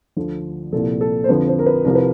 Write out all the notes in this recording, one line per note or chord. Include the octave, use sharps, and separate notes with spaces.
D2 D3 F3
C2 A#2 F3 A4
A4
C5
F2 D3 F3 B4
C5
A#4
B4
C2 C3 F3 A#4
B4